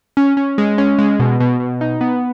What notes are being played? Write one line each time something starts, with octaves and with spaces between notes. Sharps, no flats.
C#4
C#4
G#3
C#4
G#3
B2
B2
B2
D#4
B3